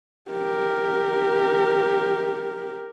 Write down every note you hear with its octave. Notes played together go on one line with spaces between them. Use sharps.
G4 A#4